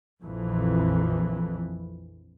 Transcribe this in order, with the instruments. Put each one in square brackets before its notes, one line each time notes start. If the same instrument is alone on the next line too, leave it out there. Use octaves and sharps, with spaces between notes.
[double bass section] A#1 F2 E3